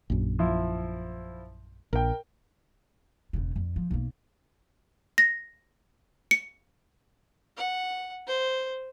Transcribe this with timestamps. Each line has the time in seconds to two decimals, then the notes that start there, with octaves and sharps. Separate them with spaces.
0.10 A#1 F#2
0.39 F3 E4
1.93 A#1 A#4 G5
3.33 E1 C#3
3.56 F2
3.76 F3
3.91 B1 A#3
5.18 A#6
6.31 C#7
7.57 F#5
8.27 C5